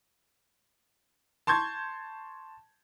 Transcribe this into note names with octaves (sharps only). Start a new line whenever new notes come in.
A5 C6 C#6 G6 G#6